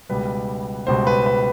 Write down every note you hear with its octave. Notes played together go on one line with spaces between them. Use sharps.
C#2 B2 G3 B4
C#2 B2 G3 C5
B4
B4